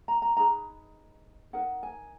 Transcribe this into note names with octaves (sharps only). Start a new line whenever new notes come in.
A#5
A#5
D#4 G#4 B4 A#5
D#4 A#4 F#5
G#5